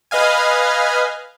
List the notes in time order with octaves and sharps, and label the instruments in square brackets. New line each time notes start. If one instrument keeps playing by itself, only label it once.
[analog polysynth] B4 D#5 F5 G#5